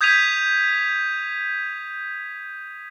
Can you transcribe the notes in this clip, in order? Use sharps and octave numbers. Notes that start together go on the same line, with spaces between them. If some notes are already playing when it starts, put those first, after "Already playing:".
D#6 G6 G#6 B6 D#7 F7